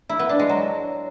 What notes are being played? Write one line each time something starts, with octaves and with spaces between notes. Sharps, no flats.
E4
B3
D4
G#3
F#3